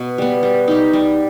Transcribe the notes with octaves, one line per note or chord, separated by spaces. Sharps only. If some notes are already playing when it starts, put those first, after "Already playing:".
Already playing: B2
G3 B3
G3
D#4 G4
G3